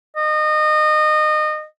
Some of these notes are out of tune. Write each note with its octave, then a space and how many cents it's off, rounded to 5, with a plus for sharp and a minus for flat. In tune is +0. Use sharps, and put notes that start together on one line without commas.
D#5 -25